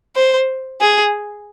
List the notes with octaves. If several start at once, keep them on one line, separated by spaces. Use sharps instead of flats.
C5
G#4